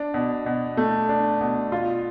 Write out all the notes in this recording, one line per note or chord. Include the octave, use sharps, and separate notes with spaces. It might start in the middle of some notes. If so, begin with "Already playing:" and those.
Already playing: D4
B2
B2
A3
D4
B2
F4